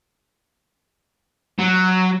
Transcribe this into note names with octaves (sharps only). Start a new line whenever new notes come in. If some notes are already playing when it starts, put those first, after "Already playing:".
F#3